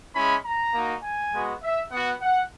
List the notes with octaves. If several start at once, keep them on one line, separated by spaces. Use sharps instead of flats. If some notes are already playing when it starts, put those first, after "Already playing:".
G#3 C#4 E4 B5
A#5
A#3 D#4 F#4
G#5
G#3 B3 F#4
E5
B3 F#4 F#5
F#5